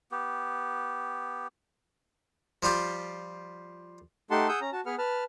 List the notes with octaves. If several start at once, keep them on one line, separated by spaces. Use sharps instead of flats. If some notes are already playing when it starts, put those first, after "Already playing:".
B3 G4
F3 G3 F4 G4
A3 D#4 G4 F#5 A5 C6
G#4 F#5 D#6 E6 G6
C#4 A#5
F#4 A5
B3 G#4 B4 F#5 F6
B4 A5 F6